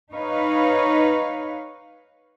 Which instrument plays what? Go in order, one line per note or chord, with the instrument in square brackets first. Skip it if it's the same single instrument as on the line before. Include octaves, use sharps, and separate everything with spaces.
[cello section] D#4 B4 C#5 F5